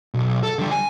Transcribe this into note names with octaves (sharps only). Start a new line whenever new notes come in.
B1
A4
D3 G3
G#5